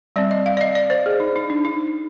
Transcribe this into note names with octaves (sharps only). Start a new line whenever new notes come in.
G3 C4 D5
D#5
F5
D5
D#5
D5
C5
G#4
D#4
D#4
D4
D#4